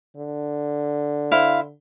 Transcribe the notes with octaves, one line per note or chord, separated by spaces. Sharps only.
D3
E4 C5 F5